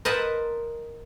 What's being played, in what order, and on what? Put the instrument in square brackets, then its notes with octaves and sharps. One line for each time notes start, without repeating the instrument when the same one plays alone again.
[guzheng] A#4 C5 D#5 F#5 A5 B5